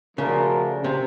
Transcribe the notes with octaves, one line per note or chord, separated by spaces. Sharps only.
C#3 F3 A3 D4 F#4 A#4
C3